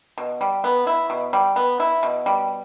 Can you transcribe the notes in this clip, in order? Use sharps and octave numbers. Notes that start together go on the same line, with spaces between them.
B2
G3
B3
E4
B2
G3
B3
E4
B2
G3